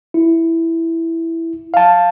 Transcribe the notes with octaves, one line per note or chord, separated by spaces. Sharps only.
E4
F5 A5